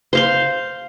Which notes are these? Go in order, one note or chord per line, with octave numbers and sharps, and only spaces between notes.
C5 F5 C6